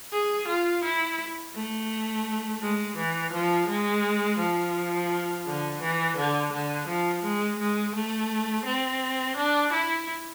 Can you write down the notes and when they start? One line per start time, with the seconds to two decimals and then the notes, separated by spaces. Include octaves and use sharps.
0.13 G#4
0.48 F4
0.84 E4
1.55 A3
2.62 G#3
2.97 E3
3.33 F3
3.68 G#3
4.39 F3
5.46 D3
5.82 E3
6.17 D3
6.53 D3
6.88 F3
7.24 G#3
7.59 G#3
7.95 A3
8.66 C4
9.37 D4
9.73 E4